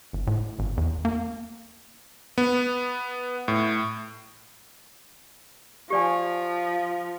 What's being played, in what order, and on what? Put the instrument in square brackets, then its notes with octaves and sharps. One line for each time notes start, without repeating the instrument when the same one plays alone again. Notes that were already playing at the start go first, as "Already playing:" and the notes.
[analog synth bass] G1
A2
G#1
E2
A#3
[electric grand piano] B3
A2
[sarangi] F3 [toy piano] G4 D5 G#5